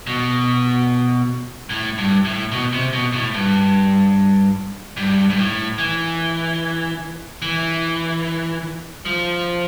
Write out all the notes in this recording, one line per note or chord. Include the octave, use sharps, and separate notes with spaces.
B2
A2
G2
A2
B2
C3
B2
A2
G2
G2
G2
A2
E3
E3
F3